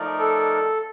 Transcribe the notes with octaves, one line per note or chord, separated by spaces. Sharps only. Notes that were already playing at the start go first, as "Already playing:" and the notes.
Already playing: F3 A3 D#4 A#4 D5
A4